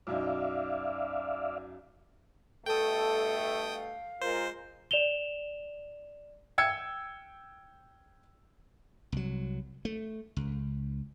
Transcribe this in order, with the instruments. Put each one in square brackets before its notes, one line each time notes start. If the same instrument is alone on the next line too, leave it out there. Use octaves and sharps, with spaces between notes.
[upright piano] B1 F#2 D#4 [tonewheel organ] D5 E5 F5
[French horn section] G2 B2 A3 [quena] A4 [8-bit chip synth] G5 D#6
[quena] F5
[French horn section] G#3 F4 A#4 [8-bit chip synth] C5
[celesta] D5 E7 F7 G7
[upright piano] G5 E6 G#6 C#7
[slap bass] C2 F#3
A3
C#2